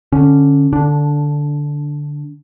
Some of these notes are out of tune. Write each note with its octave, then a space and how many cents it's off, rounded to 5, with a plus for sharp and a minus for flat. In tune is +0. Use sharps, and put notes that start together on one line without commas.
D3 +0 C#4 +0
D3 +0 D4 -15